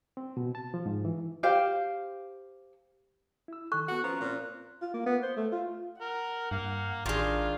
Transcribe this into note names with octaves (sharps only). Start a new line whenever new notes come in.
C4
B2
A5
F3
G#2
E3
G4 C5 F5
E4 E6
D#3 A4 C#6 F#6
B3 F#4 A4 F#5
F3 C#4 B4 A#5
A#2 C4 C#4 C5
F4
A#3
B3
C5
A3
F4
A#4 F#5
G2 A#3
A1 D#3 G#3 D4 F4